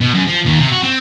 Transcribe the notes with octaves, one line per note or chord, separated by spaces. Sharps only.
B2
F#2
F3
D#2
C3
F#4
C4